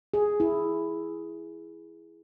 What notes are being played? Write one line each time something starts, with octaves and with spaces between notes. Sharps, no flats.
G#4
E4